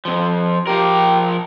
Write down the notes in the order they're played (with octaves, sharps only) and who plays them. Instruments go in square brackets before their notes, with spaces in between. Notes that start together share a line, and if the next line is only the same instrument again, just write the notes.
[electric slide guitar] F2 F3
[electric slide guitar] F3 A#4 [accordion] G4